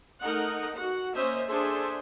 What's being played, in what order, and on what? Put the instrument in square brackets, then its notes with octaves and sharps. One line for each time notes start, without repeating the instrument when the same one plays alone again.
[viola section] A3 D#4 A#4 D#5 F#5
F#4 F#5
A#3 C#4 C5 D#5 E5
D4 G#4 A4 C5 E5 C6